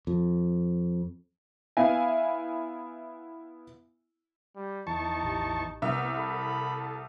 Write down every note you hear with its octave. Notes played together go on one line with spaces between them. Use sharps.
F2
B3 E4 E5 F5 G#5
G3
E2 D#4 A5 C#6
A1 G4
C2 B3 C4 A#4 E5
A4 B5